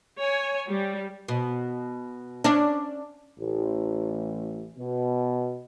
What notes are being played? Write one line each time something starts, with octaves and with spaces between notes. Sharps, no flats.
C#5 G#5
G3
B2
C#4 D4
A1
B2